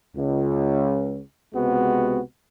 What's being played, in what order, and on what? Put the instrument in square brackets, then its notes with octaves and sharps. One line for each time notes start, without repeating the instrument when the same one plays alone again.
[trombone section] C#2
C#2 C3 G#3 B3 C4 F#4